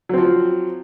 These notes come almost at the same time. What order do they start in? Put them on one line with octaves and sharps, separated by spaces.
F#3 C4 F3